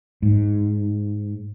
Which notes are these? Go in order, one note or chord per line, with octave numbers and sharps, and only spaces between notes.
G#2